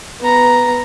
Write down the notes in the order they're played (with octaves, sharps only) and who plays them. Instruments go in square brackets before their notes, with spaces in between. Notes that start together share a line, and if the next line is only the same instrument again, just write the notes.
[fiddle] B3 A#5